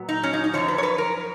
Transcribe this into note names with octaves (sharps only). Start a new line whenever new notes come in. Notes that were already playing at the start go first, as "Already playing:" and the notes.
Already playing: A#2 F#3 B3
D#4
C#4
D#4
D#4
F#2 C#3 F3 C#5
B4
C#5
B4
A#4